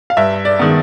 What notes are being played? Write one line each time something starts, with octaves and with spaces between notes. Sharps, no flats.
F5
G2 E5
D5
D#3 G#3 B3